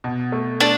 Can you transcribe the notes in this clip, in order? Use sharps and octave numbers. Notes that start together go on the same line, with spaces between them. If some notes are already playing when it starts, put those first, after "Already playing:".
B2
A3
A3 D4